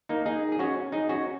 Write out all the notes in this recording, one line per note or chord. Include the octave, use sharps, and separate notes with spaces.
A#3 D#4
D#4 G#4
G#4
C#4 F#4
D#4 G#4
C#4 F#4